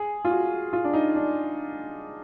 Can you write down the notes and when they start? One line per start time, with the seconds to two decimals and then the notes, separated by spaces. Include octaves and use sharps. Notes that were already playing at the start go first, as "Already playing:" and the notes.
Already playing: G#4
0.25 F4
0.30 F#4
0.73 F4
0.84 D4
0.93 D#4
1.15 D4